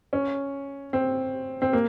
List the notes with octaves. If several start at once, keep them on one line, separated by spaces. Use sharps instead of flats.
C#4
C4
C4
A#3